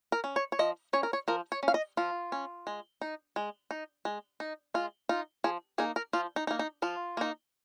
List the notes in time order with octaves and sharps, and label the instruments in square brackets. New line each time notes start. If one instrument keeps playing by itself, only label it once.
[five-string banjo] A#4
C#4
C#5
C#5
F3 D#5
C#4 C#5
A#4
C#5
F3 A#4
C#5
C#4
F5
D#5
F3 F4
C#4
G#3
D#4
G#3
D#4
G#3
D#4
G#3 F4
D#4 F4
F3 G#4
A#3 D#4 G#4
A#4
F3 F4
D#4
D#4
A#3
D#4
F3 F4
A#3 D#4